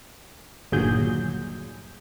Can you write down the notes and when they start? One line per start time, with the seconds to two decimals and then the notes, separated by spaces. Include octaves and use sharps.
0.72 G1 D#2 A#2 F#3 G#4 G6